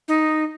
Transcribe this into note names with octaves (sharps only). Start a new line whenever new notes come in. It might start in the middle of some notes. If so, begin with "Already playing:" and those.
D#4